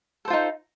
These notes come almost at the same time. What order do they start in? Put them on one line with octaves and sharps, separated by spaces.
A4 C5 F4 D#4